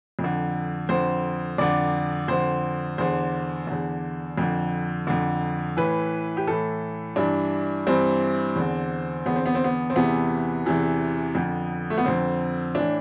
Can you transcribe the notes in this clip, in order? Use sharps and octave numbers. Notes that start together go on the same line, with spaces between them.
F2
D3
F2 D3 C5
F2 D3 D5
F2 D3 C5
E2 D3 C5
E2 D3
F2 D3
F2 D3
A2 E3 B4
G4
A2 E3 A4
G2 E3 D4
G2 E3 C4
E2 D3
E2 D3 B3
C4
B3
C4
B3
C4
E2 C3 E3 B3
E2 C3 E3
F2 D3
A3
B3
F2 D3 C4
A2 E3 D4